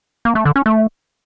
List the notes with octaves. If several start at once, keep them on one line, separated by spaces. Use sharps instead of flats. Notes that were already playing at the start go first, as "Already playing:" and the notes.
A#3
A3
D3
C#4
A3